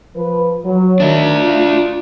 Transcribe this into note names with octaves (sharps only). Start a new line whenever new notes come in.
F3 B4
F#3
D#3 D4 E5
F4